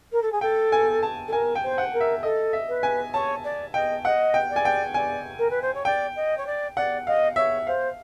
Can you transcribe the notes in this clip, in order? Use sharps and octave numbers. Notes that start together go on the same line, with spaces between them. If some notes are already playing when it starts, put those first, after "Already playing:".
A#4
A4
G#4
A4 G5
G#5
A5
A4
A#4 G#5
G5
C5
F#5
A#4
E5
A4 D#5
E5
B4
G#5
C#5 A5
D5
D#5 G5
D#5 F#5
G5
D5
G#5
G5
D5 G#5
A#4
B4
C5
C#5
D5 G5
D#5
C#5
D5
D5 F#5
D#5 F5
C#5 E5
C5 F5